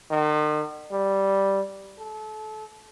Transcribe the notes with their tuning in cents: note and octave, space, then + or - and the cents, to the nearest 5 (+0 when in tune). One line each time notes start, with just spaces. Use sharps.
D#3 -45
G3 -5
A4 -30